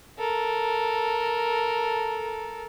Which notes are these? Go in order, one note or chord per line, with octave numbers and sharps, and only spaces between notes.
A4 A#4